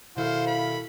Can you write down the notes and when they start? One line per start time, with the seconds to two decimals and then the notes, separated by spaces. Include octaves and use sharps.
0.17 B2 D#3 E4 A4 C5 F5
0.47 B5